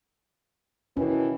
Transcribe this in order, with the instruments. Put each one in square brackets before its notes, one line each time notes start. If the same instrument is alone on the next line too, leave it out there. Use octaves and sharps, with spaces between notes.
[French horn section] B2 D#3 E3 [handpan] C#4